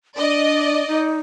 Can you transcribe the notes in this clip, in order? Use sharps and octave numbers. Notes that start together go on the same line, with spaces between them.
D4 D5 D#5
D#4